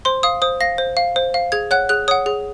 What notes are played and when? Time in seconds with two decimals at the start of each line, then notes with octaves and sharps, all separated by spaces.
0.05 C5 C6
0.23 F5 D#6
0.42 C5 D#6
0.61 F5 A#6
0.78 C5
0.97 F5
1.16 C5
1.34 F5
1.52 G#4 G#6
1.71 C#5 F#5 F#6
1.89 G#4 F#6
2.08 C#5 F#5 D#6
2.26 G#4